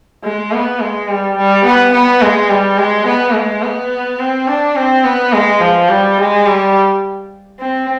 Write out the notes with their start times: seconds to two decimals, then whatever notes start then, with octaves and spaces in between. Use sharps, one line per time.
0.24 G#3
0.52 B3
0.81 G#3
1.09 G3
1.37 G3
1.65 B3
1.94 B3
2.22 G#3
2.50 G3
2.78 G#3
3.07 B3
3.35 G#3
3.63 B3
4.20 C4
4.48 D4
4.76 C4
5.05 B3
5.33 G#3
5.61 F3
5.89 G3
6.18 G#3
6.46 G3
7.59 C4